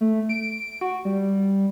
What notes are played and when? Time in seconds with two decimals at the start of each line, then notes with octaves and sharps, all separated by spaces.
0.01 A3
0.29 D7
0.81 F#4
1.05 G3